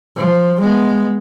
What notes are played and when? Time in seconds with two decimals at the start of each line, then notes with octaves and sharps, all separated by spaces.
0.16 F3
0.60 G#3 B3